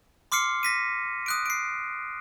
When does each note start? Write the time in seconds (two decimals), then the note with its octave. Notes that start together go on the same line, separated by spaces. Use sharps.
0.32 C6 D6 F6 C7 C#7
0.63 A#6 B6 D#7
1.26 D#6 F#6 D7
1.46 C7 D7